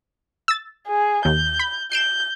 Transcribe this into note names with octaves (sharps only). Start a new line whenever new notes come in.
E6 A6
G#4
D#2 G6
B5
G6 C7 D7 E7